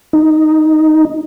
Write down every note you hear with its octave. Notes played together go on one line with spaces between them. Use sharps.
D#4